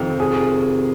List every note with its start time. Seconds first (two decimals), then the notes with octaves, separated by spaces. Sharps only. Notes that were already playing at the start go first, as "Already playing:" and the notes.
Already playing: F2 C3 D#3
0.20 G#4